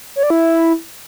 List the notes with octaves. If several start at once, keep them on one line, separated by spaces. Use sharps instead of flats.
C#5
D5
E4